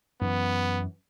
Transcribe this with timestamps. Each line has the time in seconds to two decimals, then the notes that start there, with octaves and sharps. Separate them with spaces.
0.21 F#2 E3 B3